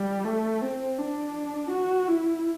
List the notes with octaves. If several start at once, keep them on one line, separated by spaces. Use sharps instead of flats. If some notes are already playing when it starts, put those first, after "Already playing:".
Already playing: G3
A3
C4
D4
F#4
E4